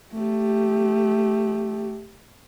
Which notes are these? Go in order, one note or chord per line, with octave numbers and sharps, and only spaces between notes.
A3 G4